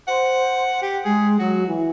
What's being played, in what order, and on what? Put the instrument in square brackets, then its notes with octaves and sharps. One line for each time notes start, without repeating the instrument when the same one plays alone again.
[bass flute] C5 [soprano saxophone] F#5
[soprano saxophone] G4
[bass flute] G#3 [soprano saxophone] G#4
[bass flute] F#3 [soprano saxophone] F#4
[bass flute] E3